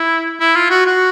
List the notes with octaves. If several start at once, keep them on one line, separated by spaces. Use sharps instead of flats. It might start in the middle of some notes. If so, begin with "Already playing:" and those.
Already playing: E4
E4
F4
F#4
F#4